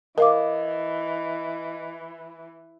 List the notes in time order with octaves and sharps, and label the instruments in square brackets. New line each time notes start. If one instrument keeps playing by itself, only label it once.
[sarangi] E3 [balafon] A#4 F5 D6 [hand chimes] D#5